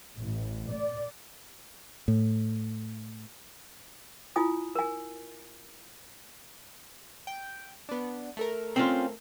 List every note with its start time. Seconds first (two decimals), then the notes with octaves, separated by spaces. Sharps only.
0.19 A1
0.71 D5
2.08 A2
4.36 E4 F4 G#5 D#6
4.75 A#4 G#5
7.27 G5
7.89 B3 D4
8.37 A3 A4 A#4
8.76 C4 C#4 F4